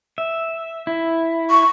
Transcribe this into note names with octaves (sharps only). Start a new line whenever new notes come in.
E5
E4
C#6